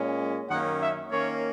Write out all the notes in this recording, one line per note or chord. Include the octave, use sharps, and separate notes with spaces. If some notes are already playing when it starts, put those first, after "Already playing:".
Already playing: A#2 G#3 C#4
F#2 D#3 A#3 C#4 F#5
E5
D#3 A#3 C#4 C#5